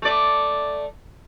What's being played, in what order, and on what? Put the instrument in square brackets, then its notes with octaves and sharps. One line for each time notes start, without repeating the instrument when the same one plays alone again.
[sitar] A3 D5